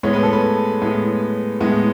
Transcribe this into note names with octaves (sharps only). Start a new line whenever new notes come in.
A2 G#3 B3 C#5
B4
A4
B4
A2 G#3 B3
A2 G#3 B3